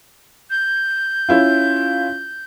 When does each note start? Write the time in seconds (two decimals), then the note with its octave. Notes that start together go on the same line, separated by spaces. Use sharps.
0.50 G6
1.29 C#4 E4 F4